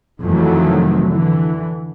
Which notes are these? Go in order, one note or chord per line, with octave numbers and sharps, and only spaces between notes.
F2 C3 D#3 E3 F#3 A3
D3 E3